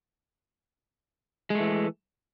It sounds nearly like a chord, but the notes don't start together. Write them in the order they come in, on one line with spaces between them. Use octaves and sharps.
G#3 A3 E3